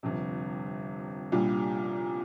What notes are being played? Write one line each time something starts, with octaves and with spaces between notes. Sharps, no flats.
G1 F2 C3
C2 A#2 G3 D4 F4